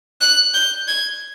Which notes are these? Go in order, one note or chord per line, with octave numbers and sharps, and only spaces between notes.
F#6
G6
G#6